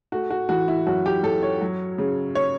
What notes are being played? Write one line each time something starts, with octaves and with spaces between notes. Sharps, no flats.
A3 F#4
F#4
E3 F#4
E4
F#2 F#4
G4
F#2 A4
C#5
F#3
C#3
C#5